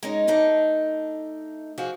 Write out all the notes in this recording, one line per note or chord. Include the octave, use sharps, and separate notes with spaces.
G#3 C#4 D#4
A3 D4 D#4
F3 F#4 G#4